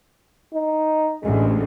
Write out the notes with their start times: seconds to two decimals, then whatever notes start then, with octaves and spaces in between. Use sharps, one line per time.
0.54 D#4
1.23 A1 D2 G#3